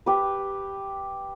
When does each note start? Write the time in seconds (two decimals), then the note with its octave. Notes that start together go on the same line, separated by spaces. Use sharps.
0.06 G4 B4